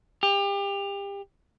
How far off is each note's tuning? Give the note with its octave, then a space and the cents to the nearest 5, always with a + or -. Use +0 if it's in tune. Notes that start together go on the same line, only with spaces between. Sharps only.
G4 +30